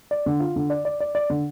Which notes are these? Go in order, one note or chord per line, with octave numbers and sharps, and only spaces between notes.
D5
D3
F4
D3
D5
D5
D5
D5
D3